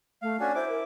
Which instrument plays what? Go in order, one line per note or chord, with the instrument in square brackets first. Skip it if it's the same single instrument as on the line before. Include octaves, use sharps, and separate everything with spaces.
[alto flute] A3 [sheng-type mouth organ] F5
[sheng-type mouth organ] C#4 D4 F#4 [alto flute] G#5
[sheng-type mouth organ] E4 D6 [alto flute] C5
[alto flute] A#4